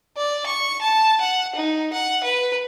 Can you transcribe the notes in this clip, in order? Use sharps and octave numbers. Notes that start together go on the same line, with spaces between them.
D5
C#6
A5
F#5
D#4
F#5
B4